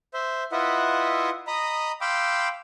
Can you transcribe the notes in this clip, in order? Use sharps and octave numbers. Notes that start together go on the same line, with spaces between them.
C5 E5
E4 F4 B4 D#5 E5 F#5
D#5 A#5 B5 D#6
F5 G5 B5 C6 D6 E6